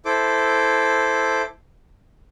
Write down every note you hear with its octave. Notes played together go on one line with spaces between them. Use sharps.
E4 A4 C5 D6